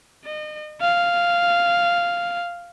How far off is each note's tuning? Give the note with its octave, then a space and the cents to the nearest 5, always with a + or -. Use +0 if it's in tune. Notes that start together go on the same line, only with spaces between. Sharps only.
D#5 -35
F5 -5